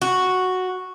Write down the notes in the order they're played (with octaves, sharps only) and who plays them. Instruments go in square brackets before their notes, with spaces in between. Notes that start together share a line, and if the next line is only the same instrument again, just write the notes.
[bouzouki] F#4